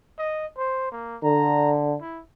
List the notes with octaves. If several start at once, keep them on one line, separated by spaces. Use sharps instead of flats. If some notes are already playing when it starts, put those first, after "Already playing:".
D#5
C5
A#3
D3 A#5
E4